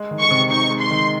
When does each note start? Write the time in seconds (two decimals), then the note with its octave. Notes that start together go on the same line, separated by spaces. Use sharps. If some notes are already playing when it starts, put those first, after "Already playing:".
Already playing: G#3
0.11 D#3
0.20 C#6
0.31 C3
0.51 D#4 C#6
0.71 G#3
0.80 C6
0.91 D#3